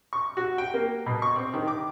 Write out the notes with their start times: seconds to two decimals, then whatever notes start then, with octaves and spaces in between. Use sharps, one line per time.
0.13 C#6
0.37 F#4
0.58 G5
0.74 A#3
1.06 B2
1.22 C#6
1.36 C4
1.54 D#3
1.68 D6